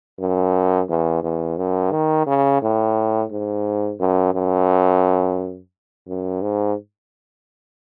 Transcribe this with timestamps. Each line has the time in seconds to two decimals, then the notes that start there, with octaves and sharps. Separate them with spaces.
0.19 F#2
0.89 E2
1.23 E2
1.57 F#2
1.92 D#3
2.26 C#3
2.62 A2
3.31 G#2
3.99 F#2
4.34 F#2
6.08 F#2
6.42 G#2